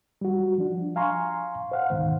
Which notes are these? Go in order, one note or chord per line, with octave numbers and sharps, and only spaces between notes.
G3 F#4
F3 D4
F5 G#5 A#5 C6 C#6
C5 F5 F#5
D2 G#2 B2 D#3